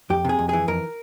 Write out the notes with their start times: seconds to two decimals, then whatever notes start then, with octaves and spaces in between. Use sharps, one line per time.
0.10 F2 G4
0.25 C3 G#4
0.39 F2
0.49 E3 G#4
0.68 F2 A#4